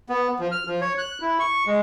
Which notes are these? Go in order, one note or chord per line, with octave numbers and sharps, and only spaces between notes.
B3
F3
F6
F3
C#5
F#6
E4
C#6
G#3